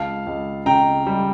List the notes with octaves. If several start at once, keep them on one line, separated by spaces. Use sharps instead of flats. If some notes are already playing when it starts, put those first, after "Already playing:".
Already playing: C#2 F5 A5
C#2
C#3 G5 A#5
G3